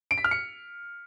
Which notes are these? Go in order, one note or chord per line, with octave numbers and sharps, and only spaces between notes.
D7
B6
F6
C#7